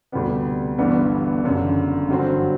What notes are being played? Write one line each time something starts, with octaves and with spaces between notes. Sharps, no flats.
D2 C3 G3 B3
G1 G2 E3 B3 D4
F#1 F#2 D3
G2 D3 F#3 C4